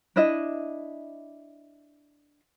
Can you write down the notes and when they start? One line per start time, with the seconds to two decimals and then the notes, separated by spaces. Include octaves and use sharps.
0.16 D4 E4 D#5 E5